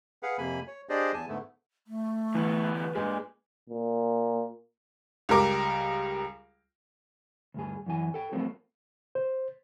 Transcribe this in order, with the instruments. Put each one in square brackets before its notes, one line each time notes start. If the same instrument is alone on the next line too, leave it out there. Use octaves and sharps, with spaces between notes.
[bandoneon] G#4 B4 F5 F#5
F2 C3 A#3 G#5 B5
C#5
D4 G4 G#4 C5 D5 D#5
E2 G#5 A5
G#2 D3 A3 B3
[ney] A3
[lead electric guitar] D2 B3 [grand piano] E3
[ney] B4
[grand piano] G2 G#3 [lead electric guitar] A#2
[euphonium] A#2
[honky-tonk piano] C#2 G3 A#4 D6
[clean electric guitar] D2 G2 G#4
F#2 E3 G#5
A4 G5
F3 F#3 A3 A#3 C4
[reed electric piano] C5